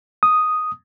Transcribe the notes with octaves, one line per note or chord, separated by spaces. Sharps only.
D#6